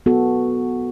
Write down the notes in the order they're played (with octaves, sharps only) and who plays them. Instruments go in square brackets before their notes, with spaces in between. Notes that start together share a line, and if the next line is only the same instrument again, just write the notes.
[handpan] B3 F#4 A4